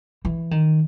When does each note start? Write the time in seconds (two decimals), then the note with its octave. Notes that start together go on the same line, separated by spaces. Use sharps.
0.25 E3
0.51 D#3